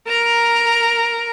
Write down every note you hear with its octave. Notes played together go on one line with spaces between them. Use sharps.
A#4 A#5